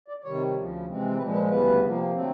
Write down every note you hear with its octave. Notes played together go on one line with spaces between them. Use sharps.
D5
C3 D#3 G3 C#5
D2 C#3 F3
C3 E3 G#3 C4
A#2 F3 G#3 B4
B4
D2 C#3 E3 G3 B3 B4
C3 F3 A#3
D3 F#3 A3 C4